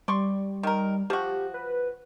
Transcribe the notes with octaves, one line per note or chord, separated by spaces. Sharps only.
G3 D5 C6 C#6
D#3 A#4
F3 F#4 G4
B4